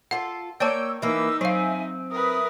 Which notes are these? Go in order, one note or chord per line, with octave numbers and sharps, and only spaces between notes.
F4 A4 F#5
A#3 C#5 D5 G5 A5 E6
E3 A#3 D#4 B4 E6
F#3 C4 E5 F5 G#5
A#4 B4 E5 D#6